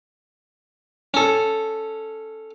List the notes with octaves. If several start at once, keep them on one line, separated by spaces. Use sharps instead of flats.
C#4 A4